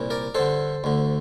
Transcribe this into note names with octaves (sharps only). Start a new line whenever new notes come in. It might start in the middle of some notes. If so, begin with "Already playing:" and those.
Already playing: C2 A#2
A#4 D5
G2 D3 A4 C5
D2 D3